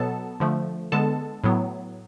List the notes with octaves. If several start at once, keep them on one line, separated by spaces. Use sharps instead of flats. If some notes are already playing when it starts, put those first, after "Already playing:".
Already playing: B2 F#3 B3 A4 A5
D3 F3 A3
D3 G#3 B3 A4 A5
A2 F#3 B3